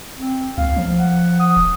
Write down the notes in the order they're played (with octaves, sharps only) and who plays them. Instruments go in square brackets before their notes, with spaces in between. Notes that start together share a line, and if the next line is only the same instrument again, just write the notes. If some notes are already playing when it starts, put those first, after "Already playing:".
[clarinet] C4
[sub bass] C#2 [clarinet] F5
[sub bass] F3
[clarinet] F#5
D#6
[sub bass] D#1